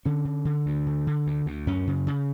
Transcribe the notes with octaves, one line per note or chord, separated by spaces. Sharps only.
D3 C#4
D3
D3
D2
D3
D3
D2
D2
F#2 C#4
C#3
C#3